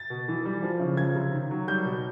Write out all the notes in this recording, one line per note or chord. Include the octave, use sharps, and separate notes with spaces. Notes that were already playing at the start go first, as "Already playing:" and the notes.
Already playing: A6
B2
E3
G3
F3
C#3
F3 G#6
C3
D#3
F#3
G3 G6
B2